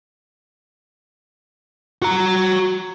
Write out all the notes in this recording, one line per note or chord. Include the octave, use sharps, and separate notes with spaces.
F#4 A#5